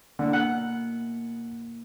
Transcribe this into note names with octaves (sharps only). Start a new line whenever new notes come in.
D3 A#3 E4
B2 A#3 F#5